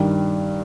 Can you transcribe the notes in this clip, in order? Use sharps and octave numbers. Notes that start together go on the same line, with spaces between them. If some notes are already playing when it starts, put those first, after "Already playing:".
Already playing: G2 D#3 G3